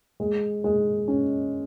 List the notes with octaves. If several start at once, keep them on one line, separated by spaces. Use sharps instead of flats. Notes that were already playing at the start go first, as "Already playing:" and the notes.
G#3
G#3
C#4